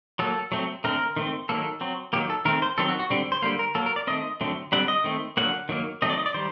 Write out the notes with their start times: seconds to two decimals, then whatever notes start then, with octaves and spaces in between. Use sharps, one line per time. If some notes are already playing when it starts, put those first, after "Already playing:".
0.19 F#3 A#3 A4
0.52 F#3 A3 C4
0.84 D3 A3 C4 A#4
1.16 D#3 A3 C4
1.49 D#3 F#3 A#3 A4
1.81 F#3 C4
2.13 D#3 F#3 A#3 G4
2.30 A4
2.45 D#3 A3 C4 A#4
2.62 C5
2.78 D#3 F#3 C4 A4
2.89 F#4
3.00 F#4
3.10 D3 G3 C4
3.32 C5
3.42 D3 G3 A#3 C5
3.59 A#4
3.75 F#3 A#3 A4
3.86 A#4
3.96 D5
4.07 D#3 A3 C4 D#5
4.41 D3 F#3 A3 C4
4.72 D3 G3 C4 F#5
4.88 D#5
5.04 D#3 A3 C4
5.37 D3 F#3 A#3 F#5
5.69 D#3 F#3 A#3
6.02 D#3 F#3 A3 C4 D#5
6.10 D5
6.18 D#5
6.26 D5
6.34 D#3 G3 C5